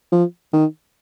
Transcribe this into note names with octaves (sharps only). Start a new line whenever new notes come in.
F3
D#3